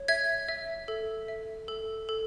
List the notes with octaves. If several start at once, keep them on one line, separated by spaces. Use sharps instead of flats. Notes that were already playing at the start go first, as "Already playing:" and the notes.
Already playing: C#5
E5 G#6
E5
A4
E5
A4
A4